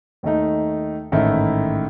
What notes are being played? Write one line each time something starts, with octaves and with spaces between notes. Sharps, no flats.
D#2 D#3 A3 D#4
A1 G#2 D#3 A3 E4